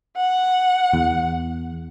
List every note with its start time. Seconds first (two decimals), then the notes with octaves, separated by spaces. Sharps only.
0.17 F#5
0.93 E2